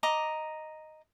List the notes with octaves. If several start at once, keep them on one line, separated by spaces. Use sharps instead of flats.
D#5 A#5 D6